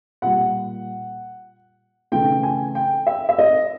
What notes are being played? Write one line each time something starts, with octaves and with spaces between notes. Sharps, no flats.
A#2 G3 F#5
C#3 E3 A3 G5
G#5
G5
E5
E5
D#5